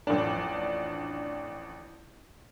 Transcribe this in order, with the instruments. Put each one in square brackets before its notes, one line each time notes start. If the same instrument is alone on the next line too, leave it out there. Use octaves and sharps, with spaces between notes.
[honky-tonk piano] A1 F2 D4